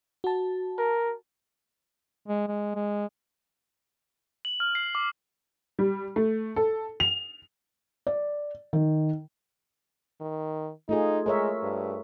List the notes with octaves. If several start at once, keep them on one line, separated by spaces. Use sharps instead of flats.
F#4 A5
A#4
G#3
G#3
G#3
F#7
F6
C7
D6
G3
A3
A4
F7
D5
D#3
D#3
A3 D#4 F4 G#4
G#3 A#4 C#5 E5
G2